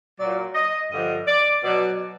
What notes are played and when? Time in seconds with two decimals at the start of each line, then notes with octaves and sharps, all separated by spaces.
0.19 A#2 F#3 D5
0.55 D#5
0.91 G2 D3 F3 D#5
1.27 D5
1.63 B2 F#3 D5